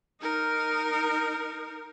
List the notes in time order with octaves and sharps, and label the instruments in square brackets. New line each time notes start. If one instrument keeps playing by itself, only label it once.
[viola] D#4 A#4